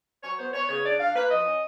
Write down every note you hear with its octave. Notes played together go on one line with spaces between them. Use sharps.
F#3 C#5
B3 C5
B3 C#5
C#3 C#5
D4 D5
D4 F5
A#3 B4
F3 D#5
C#4